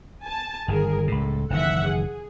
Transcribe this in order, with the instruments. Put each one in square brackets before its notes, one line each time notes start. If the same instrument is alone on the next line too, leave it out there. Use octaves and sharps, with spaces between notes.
[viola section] G#5 A5
[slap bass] G1 D#3 [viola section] G#4 A#4
[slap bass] C#2 A2 [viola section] A4
[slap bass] F#1 D#3 E3 [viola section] E5 F#5
[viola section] G#4